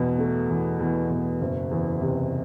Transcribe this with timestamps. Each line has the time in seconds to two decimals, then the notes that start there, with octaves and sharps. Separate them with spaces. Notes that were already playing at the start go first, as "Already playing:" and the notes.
Already playing: E2 B2
0.19 A3
0.49 E2
0.80 E2
1.10 B2
1.41 F#1
1.71 E2
2.01 C3